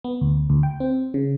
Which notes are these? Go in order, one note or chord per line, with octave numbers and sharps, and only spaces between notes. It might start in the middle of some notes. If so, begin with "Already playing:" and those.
B3
D2
D2
G5
C4
C#3